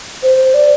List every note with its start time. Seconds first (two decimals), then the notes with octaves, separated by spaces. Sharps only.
0.23 C5
0.54 D5